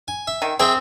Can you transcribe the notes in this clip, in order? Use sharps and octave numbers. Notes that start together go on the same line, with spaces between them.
G#5
E5
D#3
C4 G#4 E5 G5